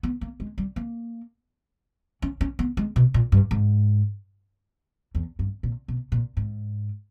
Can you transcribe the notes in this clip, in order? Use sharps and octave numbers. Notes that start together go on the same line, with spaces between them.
B3
A#3
G#3
G3
A#3
C#4
C#4
B3
G#3
B2
A#2
G2
G#2
E2
G2
A#2
B2
A#2
G#2